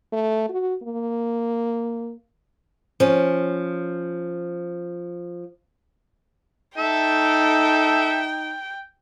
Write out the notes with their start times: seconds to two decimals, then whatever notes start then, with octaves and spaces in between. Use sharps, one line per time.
0.12 A3
0.49 F#4
0.83 A#3
3.00 F3 C#4
6.78 D#4 A4 E5 G5